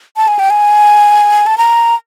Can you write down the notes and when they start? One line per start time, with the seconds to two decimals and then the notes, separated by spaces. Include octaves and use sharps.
0.17 A5
0.28 G#5
0.39 G5
0.50 G#5
1.46 A5
1.58 A#5